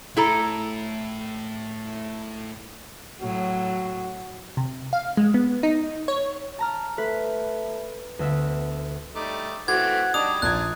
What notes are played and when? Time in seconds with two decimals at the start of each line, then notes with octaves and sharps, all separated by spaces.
0.17 A2 E4 A4 A#5
3.21 A2 F#3 F#4
4.57 C3
4.93 F5
5.17 G#3
5.34 B3
5.63 D#4
6.08 C#5
6.58 A5 A#5 F6
6.98 A3 B4
8.19 D2 B3 E5 E6
9.16 G3 A3 D#4 D6
9.68 E3 A3 C4 F#4 F#5 D6 G#6
10.14 G3 D4 D#4 D#6 F7
10.42 A#1 D4 D#4 F4 F#6 G#6